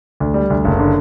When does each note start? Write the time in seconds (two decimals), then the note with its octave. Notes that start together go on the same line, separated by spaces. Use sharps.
0.20 D2
0.34 G3
0.50 D2
0.64 F#1
0.79 D3